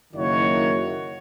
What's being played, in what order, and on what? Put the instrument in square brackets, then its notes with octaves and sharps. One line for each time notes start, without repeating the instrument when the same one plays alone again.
[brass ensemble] F#1 D#3 A#3 E4 F#4 C#5